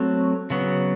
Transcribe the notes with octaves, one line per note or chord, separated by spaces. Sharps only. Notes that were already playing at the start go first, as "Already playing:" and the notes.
Already playing: F#3 A3 C4
C#3 F#3 B3